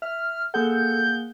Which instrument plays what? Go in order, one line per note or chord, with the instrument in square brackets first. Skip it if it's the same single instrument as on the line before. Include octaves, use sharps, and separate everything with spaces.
[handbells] E5 [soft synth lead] F6
[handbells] A#3 G#4 F#5 [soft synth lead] A4 [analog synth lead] G6